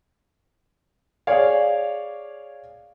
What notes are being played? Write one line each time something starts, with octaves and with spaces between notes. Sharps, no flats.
G#4 C#5 D5 F5